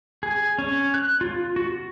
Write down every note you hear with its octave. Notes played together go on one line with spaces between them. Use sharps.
G#4
C#4
F#6
F4
F#4